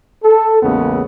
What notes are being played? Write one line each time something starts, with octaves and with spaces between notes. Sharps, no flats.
A4
A1 E2 C#3 G#3 A#3 B3